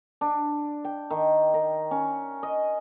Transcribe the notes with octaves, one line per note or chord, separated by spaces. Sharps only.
D4
G5
D#3
A#4
C#4
D#5